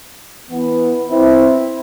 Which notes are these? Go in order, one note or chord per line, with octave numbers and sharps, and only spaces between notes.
E3 B3
C4 E4